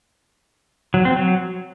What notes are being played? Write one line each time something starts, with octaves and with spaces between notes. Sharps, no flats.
F#3
C4
F#3